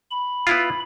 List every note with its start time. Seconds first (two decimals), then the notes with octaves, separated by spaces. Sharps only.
0.11 B5
0.47 B3 E4 F4